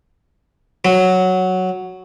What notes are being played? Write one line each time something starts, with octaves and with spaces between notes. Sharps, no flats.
F#3